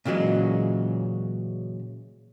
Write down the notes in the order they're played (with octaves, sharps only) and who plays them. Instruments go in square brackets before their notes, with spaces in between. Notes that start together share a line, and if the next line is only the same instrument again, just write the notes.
[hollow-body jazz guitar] A#2 C#3 E3 F#3 G#3